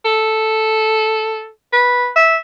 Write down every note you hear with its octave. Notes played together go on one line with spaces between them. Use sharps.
A4
B4
E5